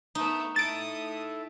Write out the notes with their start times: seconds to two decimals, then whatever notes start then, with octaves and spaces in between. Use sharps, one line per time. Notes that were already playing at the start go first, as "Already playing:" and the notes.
0.15 A3 B3 D#4
0.56 E4 A4 D#6 A6 D7